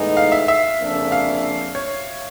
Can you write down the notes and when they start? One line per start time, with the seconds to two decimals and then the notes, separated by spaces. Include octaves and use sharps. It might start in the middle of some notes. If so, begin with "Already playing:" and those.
Already playing: A2 E3 G#3 B3 D#4
0.17 F5
0.32 E5
0.48 E5
0.80 F2 C#3 F3 A#3 D4
1.12 F5
1.75 C#5